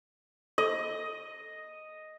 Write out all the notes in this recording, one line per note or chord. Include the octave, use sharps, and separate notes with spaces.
A4 D#5